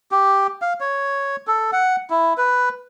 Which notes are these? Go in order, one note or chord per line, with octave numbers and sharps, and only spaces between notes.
G4
F5
C#5
A4
F#5
E4
B4